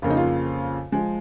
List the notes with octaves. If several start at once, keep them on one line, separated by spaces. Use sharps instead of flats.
F2 C#3 A#3 F4
D#4
F4
F3 G#3